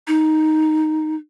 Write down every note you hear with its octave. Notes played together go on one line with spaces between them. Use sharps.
D#4